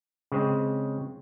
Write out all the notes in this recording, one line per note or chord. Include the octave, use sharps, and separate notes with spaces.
C#3 G#3 C4